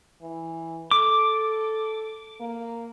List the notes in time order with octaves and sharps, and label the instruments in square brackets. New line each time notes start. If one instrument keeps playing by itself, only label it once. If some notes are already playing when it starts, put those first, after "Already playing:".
[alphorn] E3
[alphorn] A4 [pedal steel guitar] D6
[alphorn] A#3